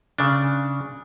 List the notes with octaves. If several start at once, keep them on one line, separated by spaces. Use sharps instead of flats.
C#3 D4